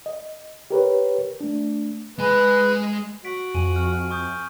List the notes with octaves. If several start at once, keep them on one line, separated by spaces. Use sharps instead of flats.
D#5
G4 A#4 B4 C#5
A3 D4
G#3 B4 G#5
F#4 B6 D7
F2 G#5 D#7 F#7
F6
C#6 D#6 G6